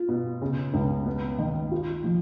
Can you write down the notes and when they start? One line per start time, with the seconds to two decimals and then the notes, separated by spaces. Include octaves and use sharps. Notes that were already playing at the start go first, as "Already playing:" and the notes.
Already playing: F4
0.09 B2
0.42 C#3
0.74 C#2
1.06 B3
1.38 D#3
1.71 F4
2.04 F3